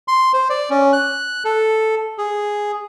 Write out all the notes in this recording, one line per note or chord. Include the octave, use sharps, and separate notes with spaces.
C6
C5
D5
C#4
F#6
A4
G#4